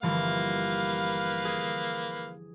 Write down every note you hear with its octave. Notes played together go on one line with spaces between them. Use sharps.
G1 E3 F3 A#3 B4 F5
G#4